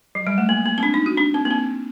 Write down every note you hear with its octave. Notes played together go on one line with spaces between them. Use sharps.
F#3
G3
A3
A#3
A#3
C4
D4
D#4
F#4
D4
C4
A#3
C4